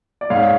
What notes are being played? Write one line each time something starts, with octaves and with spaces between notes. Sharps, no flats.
D5
G#2 C#5 F5